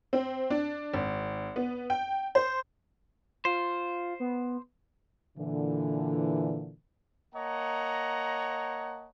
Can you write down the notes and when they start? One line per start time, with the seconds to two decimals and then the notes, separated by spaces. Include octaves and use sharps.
0.13 C4
0.50 D4
0.93 G#1
1.56 B3
1.90 G5
2.35 C5
3.45 F4 C5
4.20 B3
5.38 A#2 D3 E3
7.35 A#3 C#5 D#5 F#5 A5 A#5